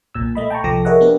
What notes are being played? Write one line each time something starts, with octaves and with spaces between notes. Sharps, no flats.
B1 A#2 E6
A3 D#5 B5
G5 A5 A#5 C#6
C2 F3 A4 D6 A#6
G#4 A#4 C#5 D#5 E5 F#5
B3 D4 G4 A#4